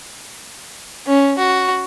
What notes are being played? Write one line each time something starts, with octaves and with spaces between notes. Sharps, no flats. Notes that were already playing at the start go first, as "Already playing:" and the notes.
C#4
F#4